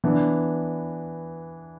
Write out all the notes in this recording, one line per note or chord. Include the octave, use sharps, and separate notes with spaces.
E3 B3 D4